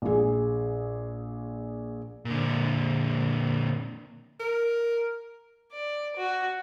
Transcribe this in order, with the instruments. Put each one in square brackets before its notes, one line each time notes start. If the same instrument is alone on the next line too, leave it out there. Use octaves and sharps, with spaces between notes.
[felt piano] A#1 G#4
[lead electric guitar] A#2 D3
[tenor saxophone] A#4
[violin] D5
F#4